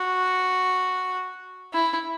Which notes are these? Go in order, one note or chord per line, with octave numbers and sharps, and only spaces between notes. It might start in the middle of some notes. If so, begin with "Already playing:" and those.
Already playing: F#4
E4